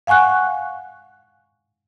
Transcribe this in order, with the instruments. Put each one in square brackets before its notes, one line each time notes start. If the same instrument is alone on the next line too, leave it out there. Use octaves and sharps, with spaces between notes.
[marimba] F5 F#5 G#5 C#6 F#6